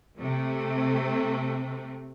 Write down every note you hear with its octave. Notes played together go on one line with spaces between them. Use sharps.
C3 A3